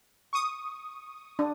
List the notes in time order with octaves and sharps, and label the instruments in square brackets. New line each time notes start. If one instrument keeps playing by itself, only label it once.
[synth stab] C#6 D#6
[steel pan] D4